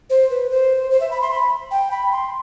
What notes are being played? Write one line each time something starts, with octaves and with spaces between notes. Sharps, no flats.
C5
B4
C5
C5
E5
B5
C6
B5
G5
B5
C6